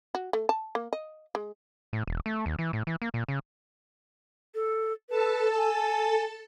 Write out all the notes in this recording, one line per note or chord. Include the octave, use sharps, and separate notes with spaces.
F#4
A3
A5
A#3
D#5
G#3
A2
E1
A3
D#2
E3
A2
E3
A#3
A#2
C#3
A4
A4 B4 A5
G#5